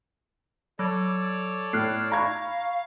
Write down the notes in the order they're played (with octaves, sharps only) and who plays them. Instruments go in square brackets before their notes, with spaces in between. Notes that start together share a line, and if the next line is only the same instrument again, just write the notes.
[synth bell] F#3 [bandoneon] A4 C#5 D5
[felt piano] A2 [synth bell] F6 F#6 C7
[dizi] F5 [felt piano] A#5 C#6 G#6 [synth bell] B5